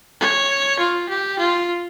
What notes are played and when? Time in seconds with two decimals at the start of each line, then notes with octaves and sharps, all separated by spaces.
0.20 C#5
0.79 F4
1.09 G4
1.39 F4